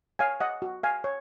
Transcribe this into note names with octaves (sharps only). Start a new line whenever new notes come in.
C#5 F5 G#5
D#5 F#5
F#4
F5 G#5
C#5